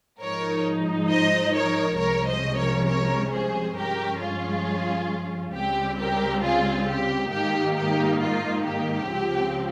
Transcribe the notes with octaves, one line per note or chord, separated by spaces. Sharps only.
G#2 F3 G#3 D#4 A#4 C#5
C5 D#5
A#4 C#5
C2 C3 F3 G#3 C#4 A#4 C#5
C5 D#5
A#4 C#5
A#4 C#5
G#4 C5
G2 F3 G#3 C#4 G4 A#4
F4 G#4
C#2 C#3 G3 C4 G4
G4 A#4
F4 G#4
G4
G#2 D#3 A#3 D#4 G4
G4
F4
G4
C#2 C#3 F3 C4